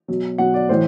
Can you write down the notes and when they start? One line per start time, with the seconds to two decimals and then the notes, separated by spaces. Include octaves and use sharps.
0.08 B2 F#3
0.38 B2 F#3 F#5
0.54 D5
0.69 A2 E3 C5